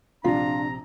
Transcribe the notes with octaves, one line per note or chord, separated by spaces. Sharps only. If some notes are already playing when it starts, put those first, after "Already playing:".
A#1 C3 D4 F4 A#5